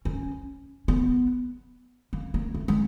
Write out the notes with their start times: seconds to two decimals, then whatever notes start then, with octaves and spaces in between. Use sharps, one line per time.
0.05 C#4
0.88 B3
2.13 A#3
2.34 A#3
2.54 A3
2.68 G#3